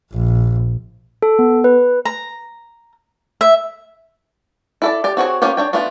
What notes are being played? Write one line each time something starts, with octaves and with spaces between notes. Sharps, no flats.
A#1
A4
B3
B4
A#5
E5
E4 A4 D5
G4 D5
C4 F#4 G#4 C#5
A#3 C#4 F4 G4 C5
D4 C#5 G5
A3 B3 D4 F4